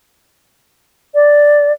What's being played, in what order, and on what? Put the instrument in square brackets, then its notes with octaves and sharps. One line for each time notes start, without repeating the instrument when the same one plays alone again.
[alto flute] D5